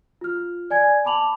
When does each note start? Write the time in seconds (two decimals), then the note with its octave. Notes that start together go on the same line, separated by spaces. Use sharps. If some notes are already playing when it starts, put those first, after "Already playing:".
0.21 F4 F6
0.70 D5 G#5 G#6
1.05 A5 B5 D6 F7 F#7